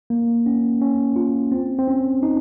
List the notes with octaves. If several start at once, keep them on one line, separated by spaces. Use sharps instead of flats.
A#3
C#4
C#4
F4
C4
C4
C#4
D#4